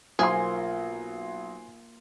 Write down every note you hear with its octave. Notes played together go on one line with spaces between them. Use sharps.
B1 A#3 F4 G#4 C5 G#5 C6